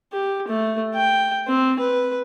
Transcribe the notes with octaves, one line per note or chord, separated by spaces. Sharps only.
G4
A3
G5
C4
B4